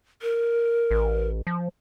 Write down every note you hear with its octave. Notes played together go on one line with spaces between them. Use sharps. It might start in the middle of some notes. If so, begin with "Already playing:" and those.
A#4
A1
F3